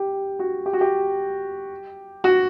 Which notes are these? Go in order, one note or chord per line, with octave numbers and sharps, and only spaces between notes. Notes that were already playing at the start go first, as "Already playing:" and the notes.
Already playing: G4
F#4
G4
F#4
G4
F#4